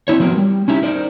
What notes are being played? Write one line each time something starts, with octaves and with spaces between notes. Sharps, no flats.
C4 C#4 E4 C#5
F3 F#3 B3 A#4
G3
C#4 D#4 E4 G4
D#4 A#4 C5 D5